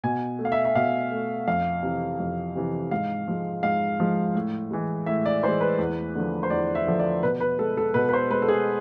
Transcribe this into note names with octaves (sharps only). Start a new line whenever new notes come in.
B2 G#5
A3
F5
E5
E5
B2 F5
A3
F2 F5
C3 E3
F2
C3 E3
G#2 F5
F3 G#3
G#2 F5
F3 G#3
A2
E3 G#3
A2 E5
D5
E3 G#3 C5
B4
E2
D3 F3
C5
E2 D5
E5
D3 F3
D5
B2 B4
B4
G#3 A4
A4
B2 B4
B4
C5
G#3 B4
A4
G#4